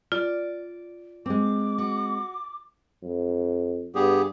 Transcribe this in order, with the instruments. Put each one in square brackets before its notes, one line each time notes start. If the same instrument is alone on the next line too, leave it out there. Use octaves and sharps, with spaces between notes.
[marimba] F4 [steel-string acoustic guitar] D5
[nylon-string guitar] G#3 C4 [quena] D6
[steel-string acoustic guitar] F#4
[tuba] F2
[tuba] G2 [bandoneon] B3 G4 G#4